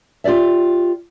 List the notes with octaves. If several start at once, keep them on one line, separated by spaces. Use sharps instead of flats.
F4 G4 G#4 D5 E5